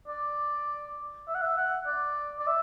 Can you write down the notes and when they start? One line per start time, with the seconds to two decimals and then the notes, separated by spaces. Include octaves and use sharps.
0.08 D5
1.28 E5
1.35 F#5
1.42 E5
1.57 F#5
1.87 D5
2.39 D5
2.47 E5